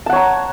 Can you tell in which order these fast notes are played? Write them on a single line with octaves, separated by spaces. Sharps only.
A5 F#5 C#5 A#5